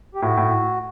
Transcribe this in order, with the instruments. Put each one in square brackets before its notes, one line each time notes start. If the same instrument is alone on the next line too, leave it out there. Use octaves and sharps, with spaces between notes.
[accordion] G4
[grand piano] A2 [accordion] F#4
[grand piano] A2